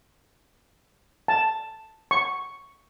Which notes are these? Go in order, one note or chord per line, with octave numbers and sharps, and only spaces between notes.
A5
C#6